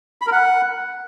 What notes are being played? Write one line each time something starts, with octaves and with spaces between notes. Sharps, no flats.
B5
A#4
F#5